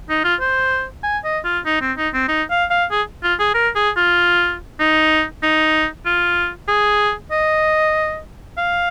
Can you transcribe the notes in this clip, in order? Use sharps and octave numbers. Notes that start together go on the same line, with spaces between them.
D#4
F4
C5
G#5
D#5
F4
D#4
C4
D#4
C4
D#4
F5
F5
G#4
F4
G#4
A#4
G#4
F4
D#4
D#4
F4
G#4
D#5
F5